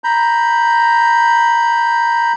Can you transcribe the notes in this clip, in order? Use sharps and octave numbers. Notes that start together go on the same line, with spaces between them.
A#5 B5 G6